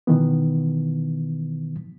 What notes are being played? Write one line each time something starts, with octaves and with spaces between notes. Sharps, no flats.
B2 D#3 E3 B3